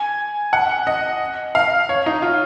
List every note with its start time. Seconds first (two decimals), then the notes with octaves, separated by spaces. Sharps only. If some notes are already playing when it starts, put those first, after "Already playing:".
Already playing: G#5
0.53 F#5
0.87 D#5
1.55 F5
1.89 C#5
2.06 D#4
2.22 F4